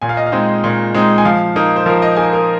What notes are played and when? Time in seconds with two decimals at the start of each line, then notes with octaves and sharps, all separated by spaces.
0.02 A#2 G#5
0.09 F5
0.17 D#5
0.26 F5
0.32 G#3 C4 D#4
0.64 A#2
0.94 G#3 C4 D#4
1.18 G#5
1.25 F3 F5
1.56 A#3 D#4
1.76 C5
1.86 F3 A#4
2.02 D#5
2.16 A#3 D#4 G#5
2.33 A#4